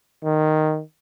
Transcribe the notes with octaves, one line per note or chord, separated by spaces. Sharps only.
D#3